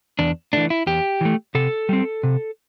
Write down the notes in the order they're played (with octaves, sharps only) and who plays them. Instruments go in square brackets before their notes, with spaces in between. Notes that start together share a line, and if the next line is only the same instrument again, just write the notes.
[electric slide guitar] E2 D4
E3 A3 D4
E4
E2 G4
E3 A3
C3 A4
G3 C4
C3